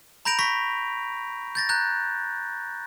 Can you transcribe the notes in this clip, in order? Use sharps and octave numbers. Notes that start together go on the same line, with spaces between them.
A#5 B5 G6 A#6 D7 F7
C#6 A#6 B6
G6 A6 A#6
A#5 F#6 G6